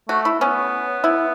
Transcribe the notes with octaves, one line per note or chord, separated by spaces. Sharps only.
A3 F#4
E4
B3 C#4
E4